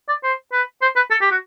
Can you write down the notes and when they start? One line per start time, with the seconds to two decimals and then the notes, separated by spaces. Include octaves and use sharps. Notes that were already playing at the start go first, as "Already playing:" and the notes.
0.09 D5
0.23 C5
0.53 B4
0.82 C5
0.96 B4
1.11 A4
1.21 G4
1.31 F#4